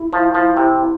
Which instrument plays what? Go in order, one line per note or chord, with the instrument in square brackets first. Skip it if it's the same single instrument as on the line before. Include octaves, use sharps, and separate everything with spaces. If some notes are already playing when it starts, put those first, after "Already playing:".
Already playing: [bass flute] E4
[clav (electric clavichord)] F3
F3
C3